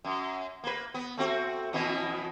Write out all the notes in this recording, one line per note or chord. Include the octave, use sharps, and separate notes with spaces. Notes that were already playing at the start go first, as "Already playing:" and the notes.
F#2
A#3 B4
B3
A3 C4 F#4
F2 B2 E3